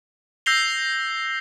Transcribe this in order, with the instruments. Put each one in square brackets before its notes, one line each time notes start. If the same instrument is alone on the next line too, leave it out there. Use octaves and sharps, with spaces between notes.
[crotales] E6 G6 A#6 C7 F7 G7